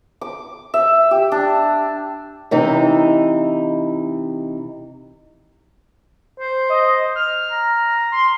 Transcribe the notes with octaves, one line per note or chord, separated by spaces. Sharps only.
D6
E5
G4
D4
C3 E3 D#4
C5
D#5
F6
A#5
C6